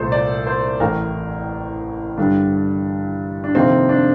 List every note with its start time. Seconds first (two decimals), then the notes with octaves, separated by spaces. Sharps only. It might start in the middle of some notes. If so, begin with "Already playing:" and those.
Already playing: C2 A#2 A3 A4 C5
0.12 D5
0.47 C5
0.80 A1 A2 A3 A#4
2.18 G2 D3 G3 D4
3.44 D4
3.55 F2 C3 D#3 A#3 C4
3.89 D4